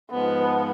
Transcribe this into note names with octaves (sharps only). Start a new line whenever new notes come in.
G#2 F3 G#3 B3